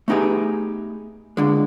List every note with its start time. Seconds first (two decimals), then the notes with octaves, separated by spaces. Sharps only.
0.08 A3 B3 D#4 G4 G#4
1.37 C#2 D3 G#3